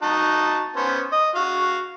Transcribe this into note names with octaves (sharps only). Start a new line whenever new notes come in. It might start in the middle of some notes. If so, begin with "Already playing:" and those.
D#4 F#4 A5
B3 C#4 C5
D#5
F#4 F5